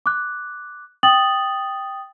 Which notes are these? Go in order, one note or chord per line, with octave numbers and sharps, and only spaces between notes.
D6 F#6
G5 D#6 A6 F#7